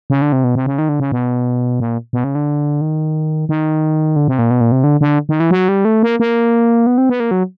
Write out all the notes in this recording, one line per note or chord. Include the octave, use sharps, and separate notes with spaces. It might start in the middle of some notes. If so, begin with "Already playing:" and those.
C#3
D3
C3
B2
C3
C#3
D#3
D3
C#3
B2
A#2
B2
C#3
D3
D#3
D#3
D3
C3
A#2
B2
A#2
C3
D3
D3
D#3
E3
F#3
G3
A3
A#3
A#3
B3
C4
B3
A#3
F#3